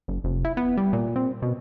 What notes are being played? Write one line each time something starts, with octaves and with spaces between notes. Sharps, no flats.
F#1
F1
E4
B3
G3
A#2
C4
B2